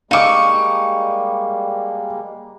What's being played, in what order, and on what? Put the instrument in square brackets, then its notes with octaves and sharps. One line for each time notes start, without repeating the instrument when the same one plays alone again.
[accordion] G3 G#3 A#3 [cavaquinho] D#4 C#6 [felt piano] F5 D6